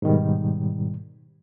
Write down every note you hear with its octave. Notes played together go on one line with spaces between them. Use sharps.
G#2 B2 D#3 G3